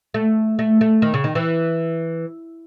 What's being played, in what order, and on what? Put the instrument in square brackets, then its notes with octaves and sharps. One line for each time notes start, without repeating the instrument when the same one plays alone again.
[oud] A3
A3
A3
D#3
C#3
D#3
E3